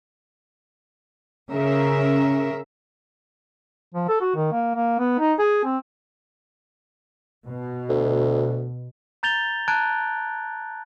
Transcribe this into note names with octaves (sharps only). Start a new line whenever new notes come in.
C#3 C#4 A#4 E5
F3
A4
F#4
D#3
A#3
A#3
B3
D#4
G#4
C4
B2
D2
A#5 G6 A6 F7 G7
A5 A#5 F#6 G#6 D7